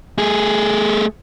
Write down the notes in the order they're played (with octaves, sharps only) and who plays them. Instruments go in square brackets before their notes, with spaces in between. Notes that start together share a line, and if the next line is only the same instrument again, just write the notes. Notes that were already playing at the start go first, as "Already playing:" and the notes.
[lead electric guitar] A3 G#4